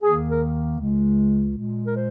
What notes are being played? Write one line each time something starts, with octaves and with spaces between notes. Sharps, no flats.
D#2 D#3 A#3 G#4
A#4
C#2 C#3 G#3
A#2 G#3
A#4
C5